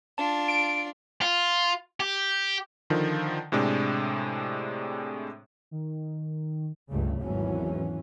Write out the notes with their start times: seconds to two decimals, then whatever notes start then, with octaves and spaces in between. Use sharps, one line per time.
0.18 D4 F4 A5
0.48 D7
1.22 F4
2.00 G4
2.90 D3 D#3 F3
3.52 A2 C3 G#3 D4
5.71 D#3
6.91 C#2 G2 C#3 A3
7.21 G#1 E2 E3 F#3 C#4